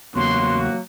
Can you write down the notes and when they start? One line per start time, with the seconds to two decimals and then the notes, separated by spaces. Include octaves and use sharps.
0.16 E2 C#3 F#3 A#3 B3 F#4 C6